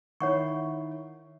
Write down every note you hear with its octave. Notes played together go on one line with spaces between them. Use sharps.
D#3 E4 C#5 F#5 C#6